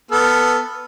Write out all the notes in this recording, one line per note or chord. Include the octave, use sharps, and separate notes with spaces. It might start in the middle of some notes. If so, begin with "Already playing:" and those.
B3 A4 F6